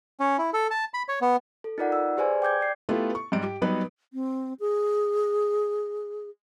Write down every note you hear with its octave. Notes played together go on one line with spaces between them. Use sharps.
C#4
E4
A4
A5
B5
C#5
B3
A4
D#4 F4 A#4 D5 F#5
E6
G4 G#4 B4 C5 D5 G#5
G5 D6 G6 G#6
D5 C7
A3 B3 E4 F4 G4 A4
C#6
G#2 G3 D7
G4
F#3 G3 B3 D#4 B4
C4
G#4